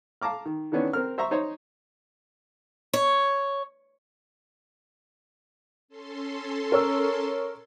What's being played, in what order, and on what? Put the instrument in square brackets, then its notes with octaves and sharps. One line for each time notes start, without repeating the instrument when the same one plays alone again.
[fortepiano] F5 A5 A#5 D6 F6
D#3
D#3 E3 B3 C#4 D4
C4 A#4 F6
C5 E5 A#5 C#6
D#4 C5 C#5
[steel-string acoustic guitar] C#5
[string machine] C#4 A4 C6
[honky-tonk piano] A#4 C#5 E6